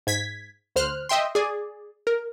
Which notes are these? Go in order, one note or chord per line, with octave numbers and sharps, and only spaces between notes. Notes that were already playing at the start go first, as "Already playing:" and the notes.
G#2 G#6 B6
D2 C5 F6 F#6
D#5 E5 G5 C6
G#4 D5
A#4